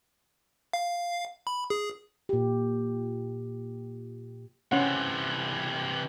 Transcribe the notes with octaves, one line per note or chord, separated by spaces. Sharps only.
F5
B5
G#4
A#2 G4
C3 E3 C#4 F#5